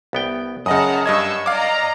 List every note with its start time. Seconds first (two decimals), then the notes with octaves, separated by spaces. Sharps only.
0.13 C2 B3 G5
0.66 F#2 C#3 D#5 F#5 A5 A#5 D#6
1.06 G2 D#5 C#6 E6 G#6
1.46 D5 D#5 F5 A#5 D6